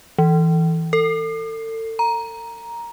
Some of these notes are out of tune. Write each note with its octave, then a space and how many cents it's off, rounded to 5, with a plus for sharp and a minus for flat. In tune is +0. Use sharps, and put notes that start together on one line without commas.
E3 -15
A4 +35
A#5 +10